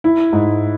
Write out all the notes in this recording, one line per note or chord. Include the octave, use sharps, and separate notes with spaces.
E4
G#2